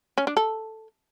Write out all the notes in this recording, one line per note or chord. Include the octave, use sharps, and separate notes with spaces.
C#4
D4
A4